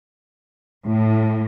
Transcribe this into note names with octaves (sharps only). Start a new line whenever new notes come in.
A2